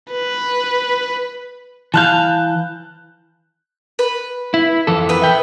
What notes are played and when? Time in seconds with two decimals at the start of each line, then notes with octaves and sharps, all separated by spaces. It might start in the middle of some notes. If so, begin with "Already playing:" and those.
0.12 B4
1.94 E3 F5 A5 F#6 G6
3.99 B4
4.54 E4
4.87 F2 E3 A4
5.09 B3 B4
5.22 E5 G5